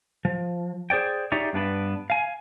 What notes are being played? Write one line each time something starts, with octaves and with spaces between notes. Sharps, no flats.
F3
G#4 C5 D5 G5
D#4 G4 G#4 C#5 D5 E5
G2 B3 D4 B4
F5 G#5